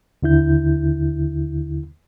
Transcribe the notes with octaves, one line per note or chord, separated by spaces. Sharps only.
D#2 D3 E4 G6